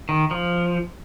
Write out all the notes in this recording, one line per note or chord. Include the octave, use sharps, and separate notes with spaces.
D#3
F3